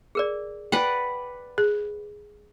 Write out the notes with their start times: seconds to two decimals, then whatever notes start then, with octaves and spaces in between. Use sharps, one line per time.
0.15 G#4 A#4 D5
0.72 B4 D5 F#5 G5
1.58 G#4